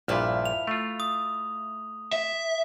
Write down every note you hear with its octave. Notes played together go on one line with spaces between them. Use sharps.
A#1 G2 A#2 E4 E5 F5
F7
A3 F4
D#6
E5